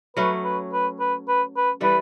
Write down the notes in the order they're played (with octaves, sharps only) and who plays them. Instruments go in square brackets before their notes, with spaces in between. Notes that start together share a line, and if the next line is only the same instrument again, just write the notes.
[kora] F#3 A3 C#4 [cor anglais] B4
[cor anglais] B4
B4
B4
B4
B4
[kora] E3 G3 D4 A4 [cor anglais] B4